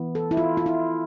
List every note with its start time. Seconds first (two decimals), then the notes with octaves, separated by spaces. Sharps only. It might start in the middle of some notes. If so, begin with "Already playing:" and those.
Already playing: E3 B3
0.15 A4
0.31 E4
0.37 F4
0.57 F4
0.66 E4